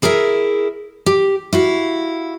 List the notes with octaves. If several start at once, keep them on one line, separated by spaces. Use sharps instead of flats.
E4 G#4 A#4 B4 E5
G4
E4 F#4 F5